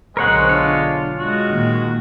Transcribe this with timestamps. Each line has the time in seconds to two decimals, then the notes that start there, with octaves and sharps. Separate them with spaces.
0.17 B1 B2 D3 G#3 A#4 C5 C#5 F#5
0.49 D4 F4 C#5
1.19 G#3 F#4
1.49 A#2 D#3 A#3